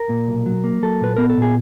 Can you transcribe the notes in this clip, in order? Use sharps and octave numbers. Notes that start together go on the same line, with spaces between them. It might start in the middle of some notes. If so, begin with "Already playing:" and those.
Already playing: A#4
A#2
B1
F#3
A#3
F#3 A4
A#2 B4
B3 A#4
A4
A#2 G#4